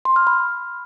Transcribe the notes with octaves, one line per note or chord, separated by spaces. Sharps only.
C6
F6
B5